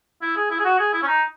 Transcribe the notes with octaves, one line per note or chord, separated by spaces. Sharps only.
E4
G#4
E4
G#4
F#4
G#4
E4
C#4
D#4